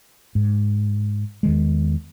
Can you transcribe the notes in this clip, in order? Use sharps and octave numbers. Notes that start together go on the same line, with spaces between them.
G#2
E2 D#3 G#3